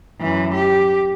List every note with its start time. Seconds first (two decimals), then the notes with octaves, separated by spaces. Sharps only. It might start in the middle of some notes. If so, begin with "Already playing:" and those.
0.20 F#2 E3
0.54 G4